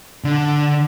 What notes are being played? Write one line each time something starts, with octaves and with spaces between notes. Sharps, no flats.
D3